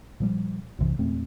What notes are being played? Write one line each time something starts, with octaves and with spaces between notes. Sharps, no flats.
A#2 F3 G3
B1 F#2 C3 E3
E1 A#2 A3 C4